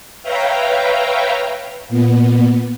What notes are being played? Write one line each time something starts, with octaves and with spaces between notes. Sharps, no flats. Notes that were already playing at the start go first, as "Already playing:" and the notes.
B4 C#5 E5 F5 G5 A#5
A#2 B3